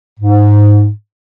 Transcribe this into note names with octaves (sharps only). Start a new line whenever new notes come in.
G#2